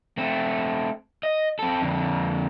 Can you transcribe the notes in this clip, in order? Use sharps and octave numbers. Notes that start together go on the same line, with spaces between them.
A3 C4
D#5
C4 A4
F2 D3